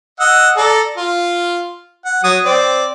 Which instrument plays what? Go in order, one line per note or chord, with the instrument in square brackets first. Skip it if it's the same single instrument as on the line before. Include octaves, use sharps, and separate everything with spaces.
[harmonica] D#5 F#5 E6
A4 D5 A#5
F4
F#5
F#3 C#5 D#6
C4 D5